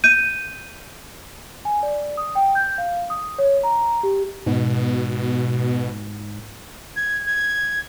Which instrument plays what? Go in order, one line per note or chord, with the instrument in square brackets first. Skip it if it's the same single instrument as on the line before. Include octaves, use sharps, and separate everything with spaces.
[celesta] G6 D#7
G#5
D5
D#6
G5
G6
F5
D#6
C#5
A#5
G4
[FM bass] G#2 [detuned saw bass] B2
[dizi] G#6
G#6